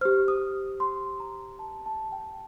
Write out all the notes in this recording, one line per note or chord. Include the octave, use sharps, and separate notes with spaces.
G4 C5 F6
D#6
C6
A#5
A5
A5
G5